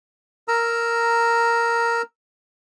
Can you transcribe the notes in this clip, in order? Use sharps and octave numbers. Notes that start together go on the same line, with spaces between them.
A#4 A#5 E6